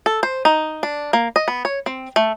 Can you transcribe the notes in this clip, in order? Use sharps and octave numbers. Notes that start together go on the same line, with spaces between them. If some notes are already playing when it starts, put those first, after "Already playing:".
A4
C5
D#4
D4
A#3
D#5
B3
C#5
C4
A3